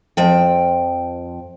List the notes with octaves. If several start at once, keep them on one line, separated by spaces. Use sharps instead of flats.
F2 F3 G5